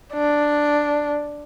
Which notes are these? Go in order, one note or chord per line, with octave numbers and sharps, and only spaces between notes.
D4